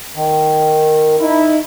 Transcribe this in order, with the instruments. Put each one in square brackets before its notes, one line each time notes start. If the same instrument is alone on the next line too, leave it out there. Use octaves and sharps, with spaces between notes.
[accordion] D#3
[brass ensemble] D#4 E4